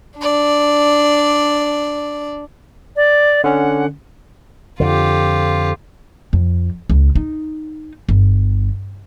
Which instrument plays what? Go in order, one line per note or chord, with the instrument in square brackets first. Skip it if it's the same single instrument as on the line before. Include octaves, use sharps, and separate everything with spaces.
[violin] D4 D5
[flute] D5
[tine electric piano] D3 C#4 [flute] F#5
[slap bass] F2 D3 [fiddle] F4 G4
[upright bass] F2
C#2
D#4
G1